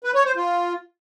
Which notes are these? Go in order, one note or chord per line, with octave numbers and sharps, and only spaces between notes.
B4
C#5
C5
F4